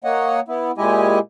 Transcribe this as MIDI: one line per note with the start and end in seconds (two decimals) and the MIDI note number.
0.04 0.40 58
0.04 0.40 73
0.04 0.40 75
0.04 0.40 78
0.48 0.71 59
0.48 0.71 64
0.78 1.19 46
0.78 1.19 56
0.78 1.19 64
0.78 1.19 67
0.78 1.19 75
0.78 1.19 80